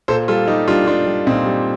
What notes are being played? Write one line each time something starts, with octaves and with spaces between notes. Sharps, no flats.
A#2 A4 C5
G3 F4 A4
G3 D#4 G4
G3 D4 F4
G3 D4 F4
G3
A#2 C4 D#4
G3